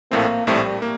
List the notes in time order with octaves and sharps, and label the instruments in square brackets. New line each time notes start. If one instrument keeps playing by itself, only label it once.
[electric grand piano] A#1 A2 A3 C4 [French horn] A#3
[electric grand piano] A#1 A2 A3 C4 [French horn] G3
[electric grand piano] A#3